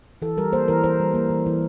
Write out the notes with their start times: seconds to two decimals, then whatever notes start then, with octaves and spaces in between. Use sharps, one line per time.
0.22 E3 A4
0.37 G3 A#4
0.52 A#3 C5
0.68 E3 A#4
0.84 E3 C5
0.99 G3
1.14 A#3
1.30 E3
1.46 E3